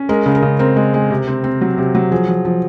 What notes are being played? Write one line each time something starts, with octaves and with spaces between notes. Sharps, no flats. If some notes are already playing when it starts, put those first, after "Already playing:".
Already playing: C#4
G#3 A#4
C#3
A#4
C#3
C4 A#4
G#3
G#3
C3
C4
C4
F#3
C3
F#3
F3 G#4
F3
F3